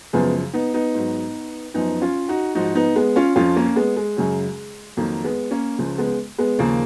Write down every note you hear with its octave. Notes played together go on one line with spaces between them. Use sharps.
F#2 C#3 F3 G#3 B3
B3 D#4
B3 D#4
G#2 F#3
F#2 F3 B3 D#4
C#4 F4
D#4 F#4
G#2 F3 D#4 F#4
B3 D#4
G#3 B3
C#4 F4
F2 F3 C#4 F4
A#3 C#4
G#3 B3
G#3
F#2 C#3 F#3
F2 D#3 F#3 A#3
G#3 B3
A#3 C#4
C#2 C#3 F3
G#3 B3
G#3 B3
D#2 C#3 F3 A#3